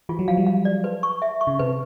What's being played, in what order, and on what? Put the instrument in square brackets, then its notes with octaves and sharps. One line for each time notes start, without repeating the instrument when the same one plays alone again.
[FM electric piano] E3 [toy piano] F4
[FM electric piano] F#3
[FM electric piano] F3 [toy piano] F5
[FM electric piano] G3
[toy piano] F5
D5
B4
C#6
E5
C#6
[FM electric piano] C#3
[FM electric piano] C3 [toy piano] B4